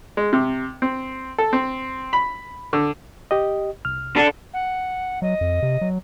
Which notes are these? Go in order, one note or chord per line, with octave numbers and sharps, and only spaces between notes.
G#3
C3
C4
A4
C4
B5
D3
G4 D#5
C2 F6
D4 A4
F#5
F#3 D#5
F2
C3
F#3